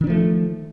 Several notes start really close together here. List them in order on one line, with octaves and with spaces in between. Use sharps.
D#3 D4 F3 A3